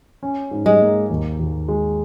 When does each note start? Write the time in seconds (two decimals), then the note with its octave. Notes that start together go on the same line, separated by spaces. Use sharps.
0.23 C#4
0.51 G#2
0.66 G#3
0.81 A#3
1.10 D#2
1.39 D#2
1.68 G#3